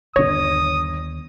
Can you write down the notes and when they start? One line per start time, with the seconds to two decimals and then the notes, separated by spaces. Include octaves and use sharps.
0.16 G1 D#2 C#5 D#6 A#6